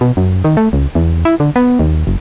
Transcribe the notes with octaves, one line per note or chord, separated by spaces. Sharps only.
B2
F#2
D#3
A3
C#2
E2
E4
D3
B3
D#2
F#1